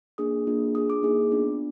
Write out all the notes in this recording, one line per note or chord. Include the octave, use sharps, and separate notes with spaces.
A#3 D4 G#4 D#6
A#3 D4 F4 G#4
D4 F4 G#4 D#6
D6
A#3 D#4 G#4
B3 D4 F4